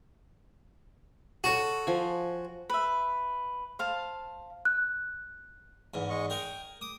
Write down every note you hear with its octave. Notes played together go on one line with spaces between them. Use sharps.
F#4 A4 C#5 A5
F3 G#5
B4 E5
C5 F5 A5
F#6
E2 G#2
G#3 D#5 C#6
G#4 A#4 G5
D6 D#6